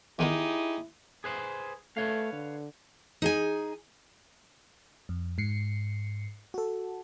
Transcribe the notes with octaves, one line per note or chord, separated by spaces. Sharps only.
E2 D#3 B3 D#4 E4 G4 G#4
G#4 B4 C5
A3 B4 C#5 F5
D3
D#4 G#4 G#5
F2
G#2 C7 C#7
F#4 A4